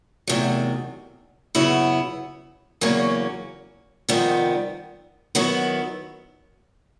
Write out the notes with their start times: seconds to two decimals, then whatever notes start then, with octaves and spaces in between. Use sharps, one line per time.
0.27 E2 C3 D#3 F#3 A3
1.55 F#2 C#3 F#3 B3 E4
2.81 E2 C#3 F#3 A#3 C#4
4.09 F2 C3 D#3 G3 B3
5.35 D#3 F#3 B3 E4